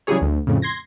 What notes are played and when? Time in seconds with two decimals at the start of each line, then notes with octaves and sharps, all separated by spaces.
0.07 C#3 E3 F#3 G3 G#4 C#5
0.22 D2
0.47 F2 A2 C#3
0.62 C6 G#6 A#6